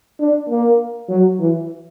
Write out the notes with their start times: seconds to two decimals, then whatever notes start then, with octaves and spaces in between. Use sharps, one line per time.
0.20 D4
0.49 A#3
1.09 F#3
1.40 E3